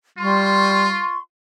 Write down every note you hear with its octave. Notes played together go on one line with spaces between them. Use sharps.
G3 F4 C6 C#6